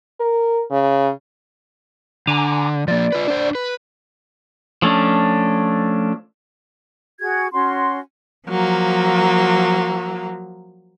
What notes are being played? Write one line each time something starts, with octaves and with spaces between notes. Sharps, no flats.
A#4
C#3
D3 G#5 A#5 D6
F3 A#3 D5
F4 B4
D4 C5
B4
F3 A3 C#4 D4
F#4 G#4 G#6
C#4 F#4 F#5 C6
F3 F#3 A#3